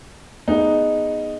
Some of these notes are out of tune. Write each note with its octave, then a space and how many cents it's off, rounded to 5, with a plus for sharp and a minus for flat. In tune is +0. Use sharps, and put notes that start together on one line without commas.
B3 +0 D#4 -5 G#4 +0